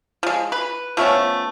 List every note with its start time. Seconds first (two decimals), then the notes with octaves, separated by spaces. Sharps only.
0.23 F3 G#3
0.52 B4
0.97 F3 A3 B3 C#4